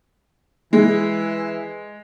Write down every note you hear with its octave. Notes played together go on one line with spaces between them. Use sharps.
E3 G#3